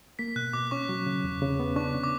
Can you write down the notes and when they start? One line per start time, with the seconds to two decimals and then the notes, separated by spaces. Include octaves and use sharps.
0.19 A#3 B6
0.36 B2 F#6
0.53 B2 D6
0.71 C#4 C#6
0.89 F#3
1.06 C#3
1.24 E2
1.42 C#3
1.60 B3
1.76 D4 C#6
1.95 C#3
2.04 D6